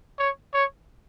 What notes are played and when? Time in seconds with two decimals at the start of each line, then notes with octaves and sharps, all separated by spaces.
0.19 C#5
0.54 C#5